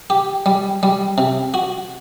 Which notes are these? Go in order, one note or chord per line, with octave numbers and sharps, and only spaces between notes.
G4
G3
G3
C3
F#4